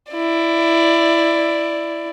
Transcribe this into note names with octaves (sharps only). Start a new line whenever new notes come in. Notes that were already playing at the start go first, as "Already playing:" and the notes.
E4 D5